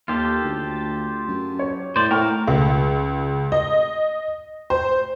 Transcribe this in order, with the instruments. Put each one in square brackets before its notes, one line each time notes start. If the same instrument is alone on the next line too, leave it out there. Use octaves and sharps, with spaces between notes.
[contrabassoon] D#2 [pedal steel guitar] F4 G4 A4
[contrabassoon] D2
F#2
[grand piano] C#5
[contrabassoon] A2 [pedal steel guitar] C5 D5
[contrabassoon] A2 [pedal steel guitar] A#4 F5 [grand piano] G5 C#6 F6
[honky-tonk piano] C#2
D#5
C5